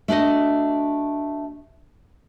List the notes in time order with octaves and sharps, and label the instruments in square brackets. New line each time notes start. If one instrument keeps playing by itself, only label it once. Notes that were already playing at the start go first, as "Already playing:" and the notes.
[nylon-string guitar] A3 D4 F#4 D#5